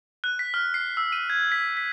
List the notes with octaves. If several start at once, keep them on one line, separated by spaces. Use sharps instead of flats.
F#6
B6
F6
C7
E6
D#7
G#6
B6
B6